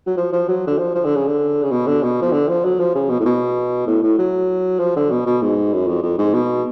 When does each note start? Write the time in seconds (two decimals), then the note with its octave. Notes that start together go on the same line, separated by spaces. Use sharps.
0.07 F#3
0.17 F3
0.33 F3
0.49 F#3
0.67 D3
0.79 F3
0.95 F3
1.05 D3
1.16 C#3
1.28 D3
1.63 C#3
1.71 B2
1.87 D3
2.03 B2
2.22 F3
2.33 D3
2.48 F3
2.65 F#3
2.80 F3
2.95 C#3
3.10 B2
3.20 A2
3.25 B2
3.87 A2
4.03 A2
4.19 F#3
4.79 F3
4.96 D3
5.11 B2
5.26 B2
5.42 G#2
5.73 F#2
5.87 F2
6.03 F2
6.18 G#2
6.34 B2